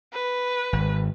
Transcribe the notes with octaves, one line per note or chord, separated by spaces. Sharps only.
B4
G#1